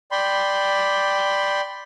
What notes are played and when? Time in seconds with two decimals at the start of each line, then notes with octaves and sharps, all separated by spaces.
0.11 D5 G5 B5 C6